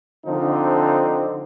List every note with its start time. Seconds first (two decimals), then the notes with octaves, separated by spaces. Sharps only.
0.25 D3 F3 C4 D#4